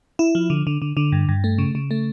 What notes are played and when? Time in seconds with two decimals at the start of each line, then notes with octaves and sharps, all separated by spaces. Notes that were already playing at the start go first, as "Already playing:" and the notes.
0.19 E4
0.35 F3
0.50 D3
0.67 D3
0.82 D3
0.97 D3
1.12 G2
1.29 G2
1.44 A3
1.58 C#3
1.75 C#3
1.91 A3